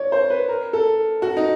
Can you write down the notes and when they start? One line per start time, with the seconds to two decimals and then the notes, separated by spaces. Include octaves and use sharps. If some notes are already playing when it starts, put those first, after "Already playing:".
Already playing: C#5 D5
0.12 C5
0.30 B4
0.48 A#4
0.73 A4
1.22 F#4
1.37 D#4